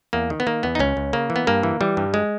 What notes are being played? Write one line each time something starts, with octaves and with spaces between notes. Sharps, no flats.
E2 A#3
D#3
B3
D#3 A#3
E2 B3
D#4
C#2 C#4
C#2
C#3 A#3
E3
B3
G2 A#3
E3
E3 G3
G2
G#3